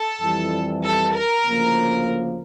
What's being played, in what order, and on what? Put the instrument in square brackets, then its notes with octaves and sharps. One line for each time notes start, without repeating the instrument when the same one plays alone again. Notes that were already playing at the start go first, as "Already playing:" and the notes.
Already playing: [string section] A4
[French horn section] F2 E3 G3
[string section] A4
A#4
[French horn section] D2 C#3 F3 A#3